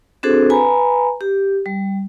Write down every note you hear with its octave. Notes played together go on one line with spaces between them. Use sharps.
C4 D4 F#4 G#4 A4 C5
B4 G#5 A#5 B5
G4
G3